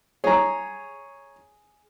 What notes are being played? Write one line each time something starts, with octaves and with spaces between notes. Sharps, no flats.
G#4 C#5 A#5